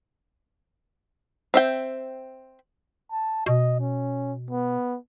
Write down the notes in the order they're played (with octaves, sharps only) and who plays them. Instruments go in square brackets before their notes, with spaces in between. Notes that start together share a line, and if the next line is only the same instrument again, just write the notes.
[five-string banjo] C4 E5 G5
[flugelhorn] A5
[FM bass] B2 [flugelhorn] D#5
[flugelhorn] C#4
B3